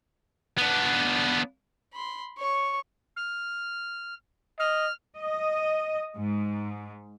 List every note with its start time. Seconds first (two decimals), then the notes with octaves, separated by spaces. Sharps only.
0.58 B3 D4
1.93 B5 C6
2.37 C#5 C#6
3.16 F6
4.59 D#5 F6
5.19 D#5
6.17 G#2